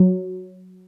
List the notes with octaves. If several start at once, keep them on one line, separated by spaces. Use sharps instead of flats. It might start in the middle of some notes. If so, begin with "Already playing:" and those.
Already playing: F#3